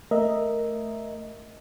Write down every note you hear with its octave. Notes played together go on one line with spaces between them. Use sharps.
A3 A#4 D#5 E5